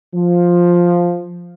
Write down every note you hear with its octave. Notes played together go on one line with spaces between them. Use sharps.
F3